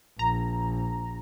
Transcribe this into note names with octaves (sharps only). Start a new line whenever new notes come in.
A#1 A#5